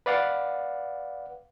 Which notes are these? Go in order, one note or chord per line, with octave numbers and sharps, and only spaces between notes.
B4 D5 F5 F#5